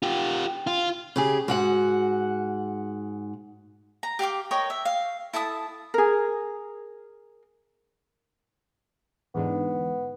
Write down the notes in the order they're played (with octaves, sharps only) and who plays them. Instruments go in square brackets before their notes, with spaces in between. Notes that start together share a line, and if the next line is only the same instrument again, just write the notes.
[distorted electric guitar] F4 G4
F4
[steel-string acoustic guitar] C#3 G4 G#4
G#2 F#4 F#5
[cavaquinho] A#5
G4 F5 G5 D6
A#4 C#5 D#5 G5
E5
F5
E4 A4 A5 D#6
[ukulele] G#4 A#4
[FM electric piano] E2 G#2 D3 [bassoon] B3